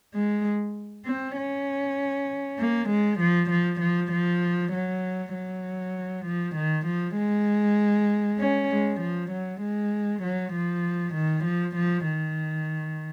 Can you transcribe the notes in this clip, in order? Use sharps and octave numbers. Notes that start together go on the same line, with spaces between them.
G#3
C4
C#4
A#3
G#3
F3
F3
F3
F3
F#3
F#3
F3
D#3
F3
G#3
C#4
G#3
F3
F#3
G#3
F#3
F3
D#3
F3
F3
D#3